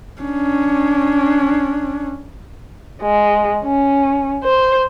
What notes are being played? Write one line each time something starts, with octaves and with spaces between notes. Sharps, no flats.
C#4 D4
G#3
C#4
C5